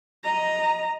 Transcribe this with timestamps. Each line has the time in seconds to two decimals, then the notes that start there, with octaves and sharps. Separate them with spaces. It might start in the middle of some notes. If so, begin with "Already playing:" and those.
0.24 D#5 A#5